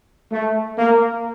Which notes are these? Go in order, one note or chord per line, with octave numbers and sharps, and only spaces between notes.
A3
A#3